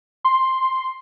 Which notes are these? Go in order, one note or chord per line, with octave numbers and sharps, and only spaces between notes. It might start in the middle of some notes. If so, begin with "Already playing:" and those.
C6